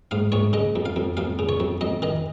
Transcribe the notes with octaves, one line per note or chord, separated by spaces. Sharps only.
G#2 F5
G#2 C#5
C#3 D#5
F2
F5
F2
F2 F5
C#3
C#5
F2
F2 D#5
D#3 D#5